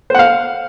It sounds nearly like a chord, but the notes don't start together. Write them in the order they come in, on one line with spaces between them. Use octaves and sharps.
C5 F#5 F5